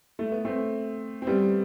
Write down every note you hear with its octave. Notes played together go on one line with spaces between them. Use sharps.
A3
B3
A3 C4
C4
G3 B3